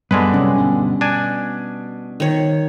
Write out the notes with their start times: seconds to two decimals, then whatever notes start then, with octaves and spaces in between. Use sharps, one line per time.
0.11 F#2 D3 G3 G#3 B3 B4
0.34 C3 F#3 C#4
0.56 G1 B2 D4
1.01 B2 D4 G#5
2.20 D#3 C#5